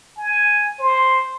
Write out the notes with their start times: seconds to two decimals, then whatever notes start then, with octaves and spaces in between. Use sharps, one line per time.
0.18 G#5
0.79 C5